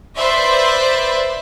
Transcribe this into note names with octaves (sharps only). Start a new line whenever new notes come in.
B4 C5 D5 E5